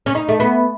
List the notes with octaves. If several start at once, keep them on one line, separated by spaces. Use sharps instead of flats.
C#4
D#4
A3
B3